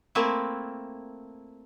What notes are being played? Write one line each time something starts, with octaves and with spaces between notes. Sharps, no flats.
A3 A#3 C4 E4